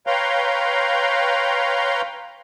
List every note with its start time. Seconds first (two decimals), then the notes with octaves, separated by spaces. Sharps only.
0.07 B4 C#5 F5 G5 A#5 C6